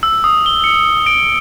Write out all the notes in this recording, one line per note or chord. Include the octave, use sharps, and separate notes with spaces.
E6
D#6
G7
C#7
D7